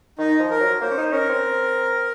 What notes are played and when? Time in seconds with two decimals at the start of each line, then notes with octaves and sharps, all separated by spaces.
0.18 D#3 D#4
0.39 F3
0.50 A#4
0.61 F#3
0.81 A#3 C5
0.91 C#4
0.98 D#4
1.12 C#4 A#4
1.29 C4